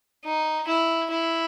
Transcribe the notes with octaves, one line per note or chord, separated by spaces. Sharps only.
D#4
E4
E4